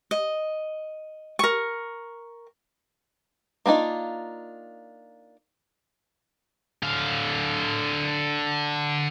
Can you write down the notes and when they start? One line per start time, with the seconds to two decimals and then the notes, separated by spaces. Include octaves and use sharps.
0.11 D#5
1.39 A#4 C#6
3.66 A#3 B3 D4 D#4 F4
6.83 D3 F5